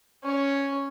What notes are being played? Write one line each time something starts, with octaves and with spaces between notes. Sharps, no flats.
C#4 C#5